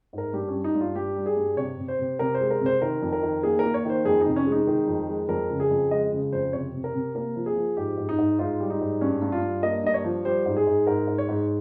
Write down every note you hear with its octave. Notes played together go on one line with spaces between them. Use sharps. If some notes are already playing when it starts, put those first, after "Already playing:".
G#2 A#4
G2 G4
C#4
G3
D#4
G2
F4
G2 G4
G3
G#4
G2
C3 C#5
C3
C5
C3
C3 A#4
C5
G#3
A#4
C3 C5
D#3 A#4
F2
A#4
D#3
A#3 G#4
A#3 A#4
C#5
D#3 C5
F2 G#4
D#4
C3
C#4
G#3
D#4
D#3
F2
G#3
F2 A#4
C#3
G#4
F2
G#3 D#5
C#3
F2 C5
C3 C#5
C3
A#4
C3
A#3 A#4
F3
G#4
F3
G#2 G4
G#2
D#4
G#2
G#2 F4
G3
D#4
G#2
G2 C#4
G2
F4
G2
A#3 D#5
G2 D#5
C#5
F3
G3 C5
G#2
G#4
G#2
G#2 A#4
G#2
C#5
G#2